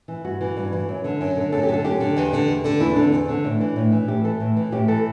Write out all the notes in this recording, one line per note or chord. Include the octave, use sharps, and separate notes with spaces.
E3
G2 F#4
E3
G2
E3
F#2
D3
F#2
D3
F#2 A4
G4
D3 A4
F#2 G4
D3
E2
D3
E2
D3
E2 E4
D4
D3
C4
E2
D3
A2 D4
E3
A2
E3
A2 G4
E3 A4
A2
E3
A2 G4
E3 A4